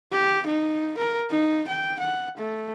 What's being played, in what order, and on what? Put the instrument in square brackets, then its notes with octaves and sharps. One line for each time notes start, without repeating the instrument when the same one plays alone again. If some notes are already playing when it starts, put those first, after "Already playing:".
[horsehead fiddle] G4
D#4
A#4
D#4
G5
F#5
A3